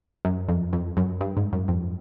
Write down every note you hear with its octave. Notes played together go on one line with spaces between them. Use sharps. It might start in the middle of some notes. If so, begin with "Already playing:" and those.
F#2
F2
F2
F#2
G2
G#2
F#2
F2